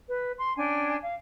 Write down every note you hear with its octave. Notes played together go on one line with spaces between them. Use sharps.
B4
C6
C#4 D4 G5 G#5
F5